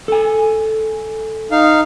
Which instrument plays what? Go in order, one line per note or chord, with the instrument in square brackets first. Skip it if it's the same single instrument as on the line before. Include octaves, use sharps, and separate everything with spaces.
[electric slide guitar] A4 G#5
[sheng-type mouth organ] D#4 F5